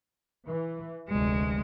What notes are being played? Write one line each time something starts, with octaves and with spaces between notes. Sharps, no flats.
E3
F1 D2 G#3